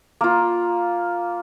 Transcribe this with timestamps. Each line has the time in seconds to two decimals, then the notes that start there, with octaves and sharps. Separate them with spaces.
0.21 A#3 F4